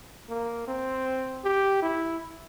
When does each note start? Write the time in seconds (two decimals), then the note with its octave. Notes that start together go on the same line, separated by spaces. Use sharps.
0.29 A#3
0.68 C4
1.44 G4
1.83 E4